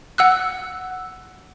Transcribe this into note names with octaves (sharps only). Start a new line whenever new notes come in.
F#5 E6 F#6